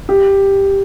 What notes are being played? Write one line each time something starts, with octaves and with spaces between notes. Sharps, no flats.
G4